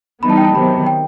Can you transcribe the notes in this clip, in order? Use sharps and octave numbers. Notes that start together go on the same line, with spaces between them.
E3 G3 B3 D#4 B5
A5
G5
A5
C3 D#3 F#3 B3 B5
G5